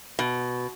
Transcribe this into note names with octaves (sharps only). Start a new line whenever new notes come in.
B2